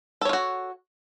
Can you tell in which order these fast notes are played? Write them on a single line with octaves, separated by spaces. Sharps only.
A4 C#5 F4 F#4